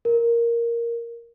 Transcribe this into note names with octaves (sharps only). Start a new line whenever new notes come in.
A#4